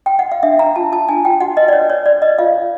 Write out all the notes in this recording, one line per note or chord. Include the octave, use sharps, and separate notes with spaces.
G5
F#5
F5
D4 E5
D4 A#5
F4 A5
F4 A5
D4 G#5
F4 G5
F#4 F#5
B4 D#5
D5
B4 C#5
B4 C#5
B4 D5
B4 D#5
F4 F5
C#5